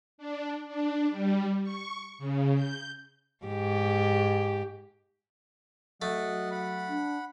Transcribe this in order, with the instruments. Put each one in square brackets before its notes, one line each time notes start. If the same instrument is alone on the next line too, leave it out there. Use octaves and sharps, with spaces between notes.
[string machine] D4
D4
G3
C#6
C#3
G6
[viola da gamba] G#2 G4
[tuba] F#3 [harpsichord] A3 [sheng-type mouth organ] D#5 F#5
[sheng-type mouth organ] F#5 B5
[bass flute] D4